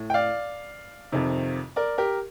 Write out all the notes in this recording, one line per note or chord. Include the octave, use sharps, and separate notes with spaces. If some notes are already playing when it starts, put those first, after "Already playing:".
Already playing: A2
G5
D5 F5
F2 C3 D#3
A#4 D5
G4 A#4